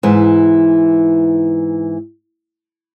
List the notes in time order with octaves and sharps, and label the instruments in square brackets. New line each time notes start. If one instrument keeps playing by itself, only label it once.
[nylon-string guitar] G#2 E3